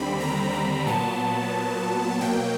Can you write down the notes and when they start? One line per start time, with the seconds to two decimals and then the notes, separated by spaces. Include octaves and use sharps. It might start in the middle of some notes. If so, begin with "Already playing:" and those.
Already playing: D#2 D3 G3 C4 B5
0.20 A#5
0.53 A#5
0.86 A#2 F#3 B3 A5
2.21 B2 F#3 A#3 G5